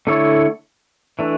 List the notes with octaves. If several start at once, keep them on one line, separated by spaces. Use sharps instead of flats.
D3 A3 E4 A4 C#5
E3 A3 D4